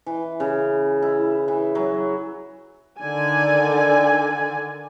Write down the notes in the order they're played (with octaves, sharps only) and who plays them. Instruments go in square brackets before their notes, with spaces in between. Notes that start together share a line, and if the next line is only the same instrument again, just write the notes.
[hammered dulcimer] E3
C#3
E4
E3
F#3
[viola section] D3 D#3 D5 G#5